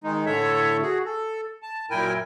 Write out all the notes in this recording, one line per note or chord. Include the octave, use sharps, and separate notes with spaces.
D#3 G#3 D#4
A2 D3 A4 C#5 E5
F#4 G#4
A4
A5
F#2 A#2 E4 A#4 G5 G#5